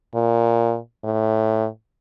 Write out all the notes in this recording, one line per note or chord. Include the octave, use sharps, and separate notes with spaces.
A#2
A2